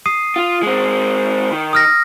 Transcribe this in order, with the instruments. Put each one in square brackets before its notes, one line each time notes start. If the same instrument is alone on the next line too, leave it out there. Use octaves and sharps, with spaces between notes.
[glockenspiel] D#6 C7 D#7
[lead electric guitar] F4
G#3 C4
D#3
[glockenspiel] D#6 F6 A#6